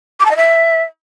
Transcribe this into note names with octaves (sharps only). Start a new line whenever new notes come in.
D6
A5
D#5
E5